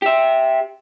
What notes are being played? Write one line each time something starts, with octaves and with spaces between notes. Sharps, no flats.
G4 E5